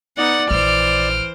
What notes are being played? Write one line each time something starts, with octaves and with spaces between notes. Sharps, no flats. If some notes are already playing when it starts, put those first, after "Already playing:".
B3 D#4 D5 F#5
A#1 E3 C5 F6 D7